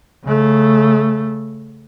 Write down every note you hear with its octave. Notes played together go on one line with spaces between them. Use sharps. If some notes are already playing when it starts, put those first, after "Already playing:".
C#3 A3